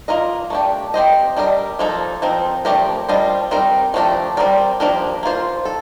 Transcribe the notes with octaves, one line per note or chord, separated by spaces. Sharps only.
A#3 F4 A#4 D#5
A3 D4 G4
C4 G4 C5 D#5
G3 D4 G4 A#4 D#5
F3 A#3 D#4 A4
F3 C4 D#4 A#4
F3 A3 D4 G4 A#4
G3 D4 F4 C5 D#5
G3 C4 D#4 A#4
F3 A3 D4 G4 A#4
G3 C4 D#4 A#4 D5
F3 A#3 D4 G4 A#4
A#3 F4 C5
A4